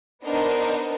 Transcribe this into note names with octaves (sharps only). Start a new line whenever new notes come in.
B3 D4 D#4 A#4 C5 D#5